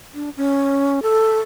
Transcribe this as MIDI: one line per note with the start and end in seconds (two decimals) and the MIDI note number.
0.14 0.30 62
0.37 1.00 61
1.03 1.39 69